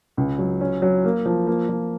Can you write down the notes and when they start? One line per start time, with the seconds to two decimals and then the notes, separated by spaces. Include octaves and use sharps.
0.17 C#2
0.38 F#3
0.61 C#4
0.82 F#3
1.04 A#3
1.25 F3
1.47 A#3
1.69 F3